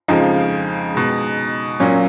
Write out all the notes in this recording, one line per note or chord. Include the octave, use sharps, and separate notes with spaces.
F2 C#3 F3 G#3 D#4
B2 G#3
A#2 F#3 C#4